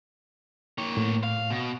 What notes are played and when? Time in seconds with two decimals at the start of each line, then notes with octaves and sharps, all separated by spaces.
0.78 A#3 C#5
0.97 A2
1.23 F5
1.50 B2